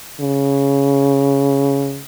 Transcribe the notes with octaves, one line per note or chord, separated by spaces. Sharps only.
C#3